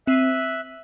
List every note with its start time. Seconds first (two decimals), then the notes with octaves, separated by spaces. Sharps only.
0.07 C4 E5 F#6 D#7